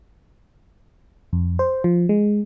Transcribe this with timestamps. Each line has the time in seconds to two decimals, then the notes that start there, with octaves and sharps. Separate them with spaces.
1.33 F2
1.59 C5
1.84 F3
2.09 G#3